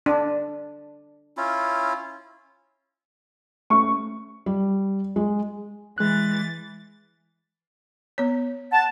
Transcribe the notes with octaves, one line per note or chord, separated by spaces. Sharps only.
D4
C#4 E4 F4
A3 C#4 C#6
G3
G#3
E3 G#3 F#6 A6
B3 C#5
F#5 A5